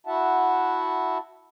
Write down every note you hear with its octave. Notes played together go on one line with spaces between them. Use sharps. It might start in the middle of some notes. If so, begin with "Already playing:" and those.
E4 F#4 E5 F#5 A5